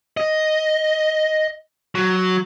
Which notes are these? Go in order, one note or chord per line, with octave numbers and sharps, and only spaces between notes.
D#5
F#3